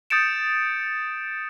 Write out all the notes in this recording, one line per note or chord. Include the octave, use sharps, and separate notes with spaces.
D#6 G6 A6 C#7 D7 E7